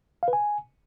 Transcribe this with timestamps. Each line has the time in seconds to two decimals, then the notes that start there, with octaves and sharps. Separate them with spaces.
0.23 F5
0.28 B4
0.33 G#5